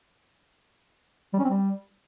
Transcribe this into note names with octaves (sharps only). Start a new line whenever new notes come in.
G3
C#4
C4
G3